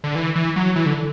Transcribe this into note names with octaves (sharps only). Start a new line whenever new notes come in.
D3
E3
E3
F#3
E3
D3